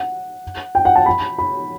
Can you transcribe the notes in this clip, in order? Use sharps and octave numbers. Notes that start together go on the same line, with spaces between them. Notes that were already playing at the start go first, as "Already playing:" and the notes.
Already playing: F#5
G5
F#5
A5
B5
B5